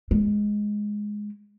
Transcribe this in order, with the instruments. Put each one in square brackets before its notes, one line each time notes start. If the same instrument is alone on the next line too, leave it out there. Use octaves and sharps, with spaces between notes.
[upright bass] G#3